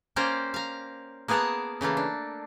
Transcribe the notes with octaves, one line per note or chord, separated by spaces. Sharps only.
A#3 C#4 C5 D5 G5 A#5
F5 A#5
A#3 B3 G#4 A#4 F#5 A5
C#3 E3 A3 A#3
D4